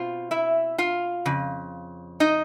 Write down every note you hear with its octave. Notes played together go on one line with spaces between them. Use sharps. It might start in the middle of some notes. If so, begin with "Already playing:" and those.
Already playing: B2 C4 F4 F5
E4 E5
F4 F5
F2 C#3
D#4 D#5